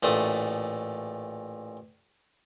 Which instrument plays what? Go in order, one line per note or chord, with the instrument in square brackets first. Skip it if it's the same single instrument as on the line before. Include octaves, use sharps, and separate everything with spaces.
[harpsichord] A1 A#2 A3 D#6